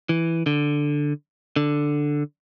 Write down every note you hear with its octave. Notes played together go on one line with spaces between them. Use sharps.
E3
D3
D3